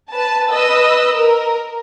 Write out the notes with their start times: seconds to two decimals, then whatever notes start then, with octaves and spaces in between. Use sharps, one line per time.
0.12 B4 A5
0.51 B4 D#5 E6
1.14 A#4